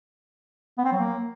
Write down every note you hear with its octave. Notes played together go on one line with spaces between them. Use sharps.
B3
C4
F#3
A#3